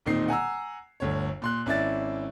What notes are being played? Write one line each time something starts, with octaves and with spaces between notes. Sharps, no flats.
E1 A#2 D#3 C4 D#4 C7
F#5 G#5 A#5 E6
G1 D2 C#5
A#2 C6 F#6
G#1 C#4 E4 D5 E5 A6